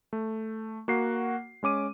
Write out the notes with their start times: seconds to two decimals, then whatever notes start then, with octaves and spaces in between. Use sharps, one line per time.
0.13 A3
0.88 A#3 F#4 F#5 C7
1.63 G#3 C#4 D6 D#7